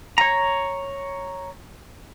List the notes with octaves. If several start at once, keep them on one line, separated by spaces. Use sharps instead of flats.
C#5 A#5